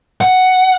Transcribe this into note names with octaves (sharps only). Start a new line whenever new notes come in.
F#5